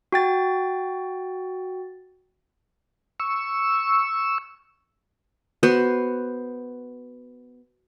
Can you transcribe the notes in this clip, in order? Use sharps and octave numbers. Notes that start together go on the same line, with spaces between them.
F#4 G5 A6
C#6 E6
B3 F#4 B4 C5